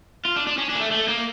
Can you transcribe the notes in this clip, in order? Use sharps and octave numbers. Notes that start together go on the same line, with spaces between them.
F4
D4
D4
C#4
D4
A#3
A3
A3
A#3